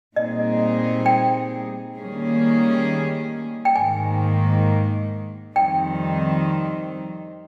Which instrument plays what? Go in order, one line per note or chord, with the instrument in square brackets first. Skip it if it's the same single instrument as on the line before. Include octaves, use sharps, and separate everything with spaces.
[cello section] A#2 G3 C4 D#4 G#4 [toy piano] D#5
[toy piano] G5
[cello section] D#3 G3 A#3 C#4 G#4
[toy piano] G5
[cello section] G#2 D#3 A#3 [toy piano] G#5
[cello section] F2 D#3 G3 C4 D#4 [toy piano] G5